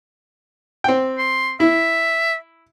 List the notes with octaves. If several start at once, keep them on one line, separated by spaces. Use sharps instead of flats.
C4 G5
C6
E4 E5